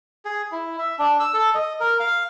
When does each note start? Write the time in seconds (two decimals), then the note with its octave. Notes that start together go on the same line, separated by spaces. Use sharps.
0.25 G#4
0.52 E4
0.78 E5
0.99 D4
1.20 E6
1.34 A4
1.55 D#5
1.80 A#4
2.00 F5